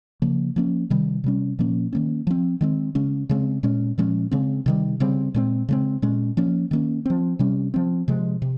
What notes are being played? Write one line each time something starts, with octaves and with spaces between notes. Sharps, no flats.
C#3 F3 A#3
F3 A#3 C#4
C3 D#3 G3
C3 G3 C#4
A#2 F3 A#3 C#4
D#3 A#3 C#4
F3 C4
D#3 G#3 C4
C#3 G#3 C#4
C#3 G#3 C4
A#2 G#3 C#4
A#2 F3 G#3 C#4
C#3 G#3 C4
C3 D#3 G3
C#3 G3 C4
A#2 G#3 C4
C#3 G#3 C4
A#2 G#3 C#4
F3 A#3 C#4
D#3 A#3 C#4
F3 C4
C3 G3 C#4
F3 C4
C3 F3 G#3
C3